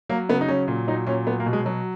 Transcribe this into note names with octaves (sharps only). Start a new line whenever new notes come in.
F#3 A#3
C#3 B3
D#4
F#3 C#4
A#2
F#3 D#4
A#2 C#4
F#3 B3
A#3
B2
G#3
F#3